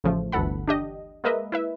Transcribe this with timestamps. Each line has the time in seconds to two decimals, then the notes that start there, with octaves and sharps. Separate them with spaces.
0.04 A1 C#3 F3 A3
0.32 G1 D2 E3 A4 F#5 B5
0.68 D4 G4 D#5
1.24 G#3 A#3 A#4 B4 D#5 E5
1.52 E4 B4 E5